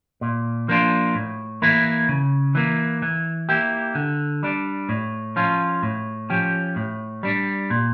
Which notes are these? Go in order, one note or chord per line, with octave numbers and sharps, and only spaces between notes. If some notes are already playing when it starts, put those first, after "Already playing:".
A#2
F3 A#3 D4 F4
A2
E3 A#3 E4
C#3
E3 A#3
E3
A#3 E4 G4
D3
G3 D4
A2
F3 C#4 F4
A2
F3 C#4 G4
A2
G3 D4
A#2